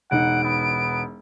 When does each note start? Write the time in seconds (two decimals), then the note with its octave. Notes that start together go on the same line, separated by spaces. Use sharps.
0.11 E1 D#4 F#5 D7
0.44 B3